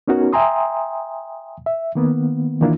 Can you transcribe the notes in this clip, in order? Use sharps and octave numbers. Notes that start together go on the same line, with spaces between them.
B3 C#4 D#4 F#4 A#4 C#5
E5 G5 G#5 A#5 C6 D#6
E5
D#3 A#3 B3
D#3 E3 A#3 D4 E4 F4